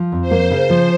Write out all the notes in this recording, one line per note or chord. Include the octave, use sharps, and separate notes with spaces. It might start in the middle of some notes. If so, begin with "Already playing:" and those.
Already playing: F3
F2
C5
A#3
C#3
F3